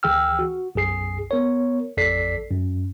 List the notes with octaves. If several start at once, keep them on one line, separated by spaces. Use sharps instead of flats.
D2 E3 G#4 G5 E6 F6
F#4
B1 F#2 G#4 C7
B3 A#4 C#5
A1 F2 A4 D5 B6 C7
F#2